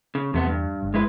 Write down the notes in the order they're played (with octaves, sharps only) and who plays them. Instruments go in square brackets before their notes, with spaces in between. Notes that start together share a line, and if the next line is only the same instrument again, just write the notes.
[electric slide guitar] C#3
[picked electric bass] E2 [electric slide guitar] C3 A3 B3
[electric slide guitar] G2
[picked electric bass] G1
[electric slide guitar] G#3 E4 B4